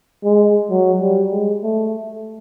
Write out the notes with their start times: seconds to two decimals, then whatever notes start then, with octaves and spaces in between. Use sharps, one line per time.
0.24 G#3
0.70 F#3
1.01 G3
1.32 G#3
1.63 A3